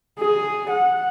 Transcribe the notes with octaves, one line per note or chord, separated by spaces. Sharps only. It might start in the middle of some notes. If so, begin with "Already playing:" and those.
G#4
F#5